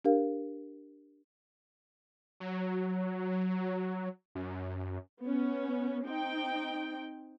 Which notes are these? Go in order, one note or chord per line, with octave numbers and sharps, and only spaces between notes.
D4 G4 A#4 F5
F#3
F#2
B3 C#4
C4 D#4 G5